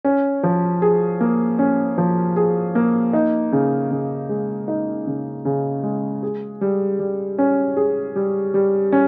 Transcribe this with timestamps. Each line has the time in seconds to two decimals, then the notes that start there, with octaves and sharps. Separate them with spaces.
0.05 C#4
0.43 F3
0.82 G#4
1.21 A#3
1.59 C#4
1.98 F3
2.36 G#4
2.75 A#3
3.13 D#4
3.52 C#3
3.91 C#3
4.29 G#3
4.68 D#4
5.07 C#3
5.45 C#3
5.83 G#3
6.23 G#4
6.61 G3
6.99 G3
7.38 C#4
7.77 G#4
8.15 G3
8.54 G3
8.92 C#4